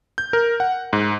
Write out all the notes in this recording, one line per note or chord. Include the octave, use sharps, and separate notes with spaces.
G6
A#4
F#5
G#2